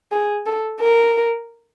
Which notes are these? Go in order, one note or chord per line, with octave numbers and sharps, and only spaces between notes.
G#4
A4
A#4